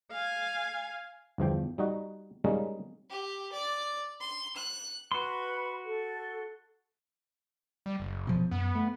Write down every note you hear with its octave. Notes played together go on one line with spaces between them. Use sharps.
F5 G#5
G1 E2 F3 G5
G3 D#4 F#4
G3 G#3 A#3 C#4 D#4 G#4
G4
D5
C6
F#6
F#4 B4 B5 C6
A4
G3
F#1
B2 F3
F#2 B3
A3